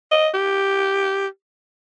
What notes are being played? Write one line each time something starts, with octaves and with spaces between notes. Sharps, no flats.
D#5
G4